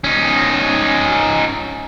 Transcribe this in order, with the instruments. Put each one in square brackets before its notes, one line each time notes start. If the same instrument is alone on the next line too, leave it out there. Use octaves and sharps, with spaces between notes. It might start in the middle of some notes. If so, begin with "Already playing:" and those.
[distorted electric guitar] C#4 D#4